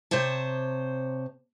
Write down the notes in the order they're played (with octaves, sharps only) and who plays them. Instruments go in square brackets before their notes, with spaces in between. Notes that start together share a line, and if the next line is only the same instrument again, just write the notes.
[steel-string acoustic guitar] C3 C5 C#5 A5